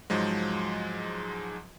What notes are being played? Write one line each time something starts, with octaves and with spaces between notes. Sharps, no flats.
G#2 F3 F#3 G#3